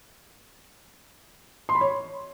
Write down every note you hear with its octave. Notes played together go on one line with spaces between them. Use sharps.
C6
B5
C#5